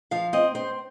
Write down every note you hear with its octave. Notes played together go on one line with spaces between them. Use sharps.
F3 F5
C4 D#5
C4 C5